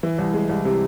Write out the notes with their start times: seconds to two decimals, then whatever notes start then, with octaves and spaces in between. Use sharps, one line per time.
0.03 E3
0.18 C2
0.34 G#3
0.49 C2
0.65 C3